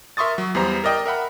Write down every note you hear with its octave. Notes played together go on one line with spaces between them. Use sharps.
A#4 E5 C6 C#6 D#6 A6
F#3
E2 G3 B3 C5 A#5
A#4 D5 D#5 G5
A#4 E5 F#5 B5